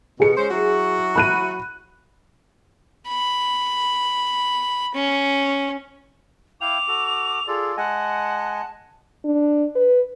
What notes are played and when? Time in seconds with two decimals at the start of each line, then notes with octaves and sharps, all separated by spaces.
0.20 B2 G#4 C#7
0.37 G#3 C#4 C5
0.51 F#3 E4 F#4
1.16 B5 F#6 D#7
3.09 B5
4.94 C#4
6.61 E4 F5 G5 D6 F7
6.88 F#4 A4
7.48 F4 G#4 A4 D5
7.77 G#3 D#5 F#5 G#5 A5
9.25 D4
9.75 B4